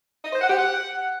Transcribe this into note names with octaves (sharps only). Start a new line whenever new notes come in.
D#5
C5
F#5
G4
F#5